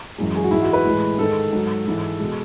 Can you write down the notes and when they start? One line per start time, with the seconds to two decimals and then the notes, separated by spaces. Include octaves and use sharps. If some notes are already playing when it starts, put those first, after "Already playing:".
0.18 F#2 E3 G#3
0.36 G#4
0.44 F#4
0.51 G#2 E3 G#3 E4
0.62 F#4
0.73 B4
0.85 A2 E3 G#3
1.18 G#2 D#3 G#3 A4
1.53 G#2 F#3
1.86 G#2 E3 G#3
2.20 B2 G#3